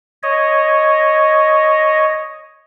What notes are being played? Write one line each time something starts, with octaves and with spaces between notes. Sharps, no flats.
C#5 D#5